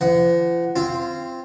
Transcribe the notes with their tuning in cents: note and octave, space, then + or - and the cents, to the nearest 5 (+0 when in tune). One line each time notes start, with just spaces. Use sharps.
F3 -40 F#5 +0
C4 +0 F4 -25